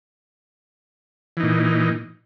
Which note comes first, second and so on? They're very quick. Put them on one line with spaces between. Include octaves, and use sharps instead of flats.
E3 D#4 A#2